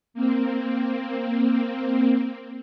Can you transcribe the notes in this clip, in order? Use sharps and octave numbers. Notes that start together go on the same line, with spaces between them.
A#3 C4